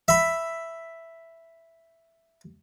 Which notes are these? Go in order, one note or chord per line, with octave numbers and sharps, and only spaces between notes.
E5 B5